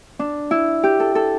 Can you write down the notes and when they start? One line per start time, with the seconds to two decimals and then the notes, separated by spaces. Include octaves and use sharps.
0.19 D4
0.51 E4
0.83 G4
1.00 A4
1.15 A4